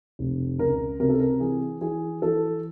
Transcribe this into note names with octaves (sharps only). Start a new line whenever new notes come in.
F1
C#2 A#4
C3 A#4
A4
A#4
E3 G#4
E3 G#4
E3 A4